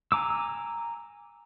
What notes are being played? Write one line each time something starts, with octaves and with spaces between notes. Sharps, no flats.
G#5 A#5 D6 E6